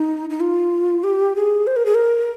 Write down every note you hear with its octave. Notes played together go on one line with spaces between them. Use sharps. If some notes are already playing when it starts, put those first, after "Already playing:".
Already playing: D#4
D#4
F4
G4
G#4
C5
A#4
G#4
A#4